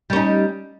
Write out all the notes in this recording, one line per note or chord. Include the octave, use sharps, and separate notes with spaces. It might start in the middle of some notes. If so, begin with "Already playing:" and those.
G3 C#4 D#4